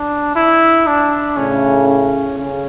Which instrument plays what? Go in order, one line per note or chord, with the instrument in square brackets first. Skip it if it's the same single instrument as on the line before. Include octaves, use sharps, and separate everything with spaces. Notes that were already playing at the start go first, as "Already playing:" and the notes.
Already playing: [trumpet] D4
E4
D4
[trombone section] A2 C#3 [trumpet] C#4
[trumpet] C#4
[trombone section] C#3 [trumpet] C#4